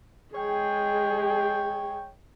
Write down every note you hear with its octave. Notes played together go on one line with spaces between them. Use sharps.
G#3 G#4 C#5 G5